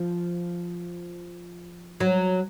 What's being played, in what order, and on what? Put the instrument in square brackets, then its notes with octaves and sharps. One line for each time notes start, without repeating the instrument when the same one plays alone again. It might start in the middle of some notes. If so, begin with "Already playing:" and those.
Already playing: [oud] F3
F#3